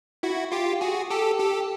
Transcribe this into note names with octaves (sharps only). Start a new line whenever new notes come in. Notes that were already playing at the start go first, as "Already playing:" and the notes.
E4 F#4
F4 G4
F#4 G#4
G4 A4
G4 A4